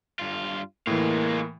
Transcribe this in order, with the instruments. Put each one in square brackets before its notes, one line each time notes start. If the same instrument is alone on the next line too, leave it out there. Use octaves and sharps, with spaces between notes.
[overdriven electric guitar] G2 F4
[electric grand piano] A2 E3 [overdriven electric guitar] G#3 F4 [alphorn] A#3